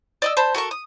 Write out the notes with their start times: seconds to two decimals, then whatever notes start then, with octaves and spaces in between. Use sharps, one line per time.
0.22 D5 D#5 E6
0.37 C5 A5 B5
0.55 F#4 A4 A#4 C#6
0.71 D#6